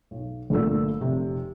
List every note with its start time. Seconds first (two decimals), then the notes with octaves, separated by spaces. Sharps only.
0.11 B1
0.50 G1 A#2 D3 A3 A4 E6
1.01 F1 C3